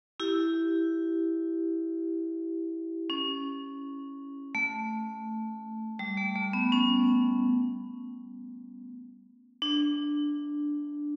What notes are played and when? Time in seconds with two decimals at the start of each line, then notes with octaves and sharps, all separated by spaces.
0.20 E4 G4
3.10 C#4
4.55 A3
5.99 G3
6.17 A3
6.35 A3
6.53 B3
6.72 C#4
9.62 D4